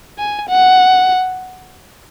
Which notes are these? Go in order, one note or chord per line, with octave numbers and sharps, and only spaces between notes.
G#5
F#5